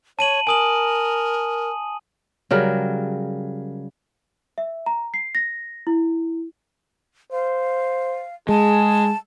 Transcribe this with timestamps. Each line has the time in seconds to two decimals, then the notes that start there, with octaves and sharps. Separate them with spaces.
0.19 C#5 A5 D#7 F#7
0.47 A#4 G#5 D#6 F#7
2.51 C#3 F#3 G3 A#4
4.58 E5
4.86 A#5
5.14 C7
5.35 A#6
5.87 E4
7.32 C5 F5
8.49 G#3 G#4 A5